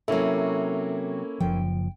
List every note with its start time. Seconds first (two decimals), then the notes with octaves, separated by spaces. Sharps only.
0.08 C3 F#3 A#3 C#4 E4 A4
1.40 F#1 F3 G5